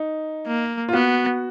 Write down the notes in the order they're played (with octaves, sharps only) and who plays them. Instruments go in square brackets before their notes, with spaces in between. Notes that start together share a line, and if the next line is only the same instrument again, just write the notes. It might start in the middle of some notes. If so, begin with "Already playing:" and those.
Already playing: [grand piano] D#4
[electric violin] A#3
[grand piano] F4
[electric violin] B3 [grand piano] F#4